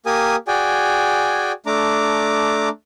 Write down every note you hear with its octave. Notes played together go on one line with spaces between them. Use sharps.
A#3 G4 A#4 G#5 D#6
F#4 G#4 D5 G5 G#5
A3 D4 A#5 D6